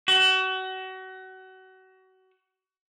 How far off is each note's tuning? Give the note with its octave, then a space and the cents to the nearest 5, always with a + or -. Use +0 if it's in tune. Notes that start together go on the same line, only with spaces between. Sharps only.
F#4 +30